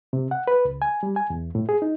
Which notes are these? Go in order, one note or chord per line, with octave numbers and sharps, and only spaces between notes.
C3
F#5
B4
C#2
G#5
G3
G#5
E2
A2
G#4
D#4